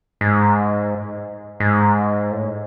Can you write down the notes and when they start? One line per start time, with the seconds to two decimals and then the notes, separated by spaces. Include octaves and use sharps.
0.21 G#2
1.60 G#2
2.31 A2